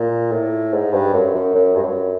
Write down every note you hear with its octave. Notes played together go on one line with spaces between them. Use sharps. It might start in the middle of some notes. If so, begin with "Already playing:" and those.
Already playing: A#2
A2
G#2
G2
F#2
F#2
F#2
G2
F#2